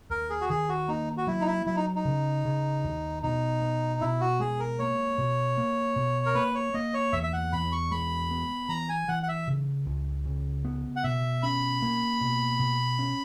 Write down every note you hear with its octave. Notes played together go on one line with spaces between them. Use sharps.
D#2 A#4
G#4
F#4
D#3 G#4
F#4
A#3 D#4
F#4
F#3 E4
D#4
E4
F#3 E4
D#4
D#4
C#3
C#3
D#2
B2 D#4
B3
B2 E4
F#4
G#3 G#4
A#4
A#3 C#5
B2
A#3
B2
A#4
A#3 B4
C#5
A#3 D#5
C#5
E2 E5
E5
F#5
E2 B5
C#6
G#3 B5
B3
E3 A#5
G#5
E3 F#5
F#5
E5
C#3
C#2
C#3
B3
F#5
B2 E5
C#4 B5
A#3
B2
B2
C#4